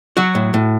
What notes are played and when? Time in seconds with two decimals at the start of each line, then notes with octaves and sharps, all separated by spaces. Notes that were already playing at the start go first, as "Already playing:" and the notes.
0.17 F#3 F#4
0.35 A2
0.54 A2